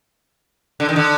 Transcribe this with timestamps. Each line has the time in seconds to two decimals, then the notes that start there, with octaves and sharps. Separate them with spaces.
0.80 D3
0.89 D#3
0.96 D3